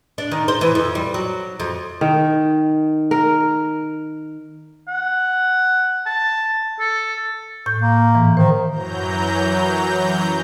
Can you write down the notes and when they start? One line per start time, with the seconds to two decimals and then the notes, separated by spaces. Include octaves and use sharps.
0.18 D4
0.31 D#3
0.48 C5
0.61 E3
0.75 F2
0.95 G3
1.14 F#3
1.60 F2
2.01 D#3
3.11 A#4
4.88 F#5
6.06 A5
6.80 A4
7.66 A2 G6
7.82 A#3
8.15 G#2 E3
8.37 D#3 C5
8.70 F#2 E3 F#3 A#5 G6